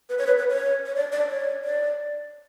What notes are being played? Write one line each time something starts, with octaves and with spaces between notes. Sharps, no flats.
B4
C#5
B4
B4
C#5
C#5
D5
D5
C#5
D5